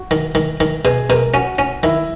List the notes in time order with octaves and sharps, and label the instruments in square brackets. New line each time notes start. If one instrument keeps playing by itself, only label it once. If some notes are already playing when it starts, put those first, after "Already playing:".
Already playing: [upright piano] F#4
[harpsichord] D#3
D#3
D#3
[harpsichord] B2 [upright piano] G#4
[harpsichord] B2 [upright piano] A#4
[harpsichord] C#4 [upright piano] F#4
[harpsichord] C#4
[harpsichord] D#3 [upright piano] E4